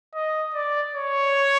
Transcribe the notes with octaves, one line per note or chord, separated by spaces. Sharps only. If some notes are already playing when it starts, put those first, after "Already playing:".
D#5
D5
C#5